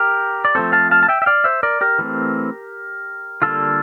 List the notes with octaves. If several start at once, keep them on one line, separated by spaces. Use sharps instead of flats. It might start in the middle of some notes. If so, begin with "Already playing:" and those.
Already playing: G4 A#4
D5
F3 A3 C4 A4 C5
F5 A5
F5 A5
A5
E5 G5
E5
D5 F5
C5 E5
A#4 D5
G4 A#4
E3 A3 C4
D3 G3 A#3 F4 A4